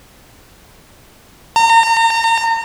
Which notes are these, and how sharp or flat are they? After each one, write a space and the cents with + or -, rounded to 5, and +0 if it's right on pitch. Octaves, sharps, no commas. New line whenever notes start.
A#5 -35